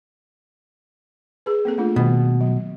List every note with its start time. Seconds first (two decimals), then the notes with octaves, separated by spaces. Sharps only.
1.46 G#4 B4
1.65 A#3 C4 A4
1.78 A3 D4 F4
1.96 B2 D#3 G3 B3
2.41 F#3